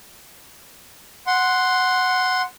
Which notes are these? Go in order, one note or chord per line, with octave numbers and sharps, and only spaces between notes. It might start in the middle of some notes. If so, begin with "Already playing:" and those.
F#5 C6